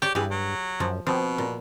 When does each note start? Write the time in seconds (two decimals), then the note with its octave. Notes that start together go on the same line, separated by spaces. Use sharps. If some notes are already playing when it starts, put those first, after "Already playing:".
0.02 G4 C#5 D5
0.15 G2 E3 G4 G#4
0.31 F#3
0.80 F#2 F3
1.07 B2 F3 C4
1.38 A#2